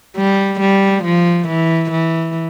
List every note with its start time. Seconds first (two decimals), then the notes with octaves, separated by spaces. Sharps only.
0.17 G3
0.61 G3
1.05 F3
1.49 E3
1.92 E3